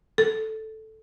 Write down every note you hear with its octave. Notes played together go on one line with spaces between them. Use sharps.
A4